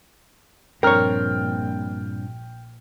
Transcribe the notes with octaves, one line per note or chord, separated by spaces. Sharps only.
A#1 G2 C4 D4 A#4 C#5 G5 F6